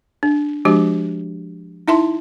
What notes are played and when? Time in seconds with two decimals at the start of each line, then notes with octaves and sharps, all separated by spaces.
0.23 D4
0.65 F3 G#3 D4 F#4 G4
1.88 D#4 E4 E5 A5 C6